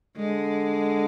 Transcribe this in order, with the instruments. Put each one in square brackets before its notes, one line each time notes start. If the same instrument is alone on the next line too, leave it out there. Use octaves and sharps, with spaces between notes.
[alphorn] D3 [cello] G#3